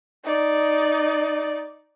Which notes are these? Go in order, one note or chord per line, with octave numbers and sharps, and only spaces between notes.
D#4 D5